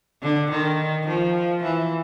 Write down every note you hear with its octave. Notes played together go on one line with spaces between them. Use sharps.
D3
D#3
F3
E3